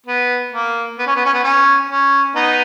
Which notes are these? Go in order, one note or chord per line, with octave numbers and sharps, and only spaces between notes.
B3
A#3
B3
C#4
B3
C#4
B3
C#4
C#4
B3 D#4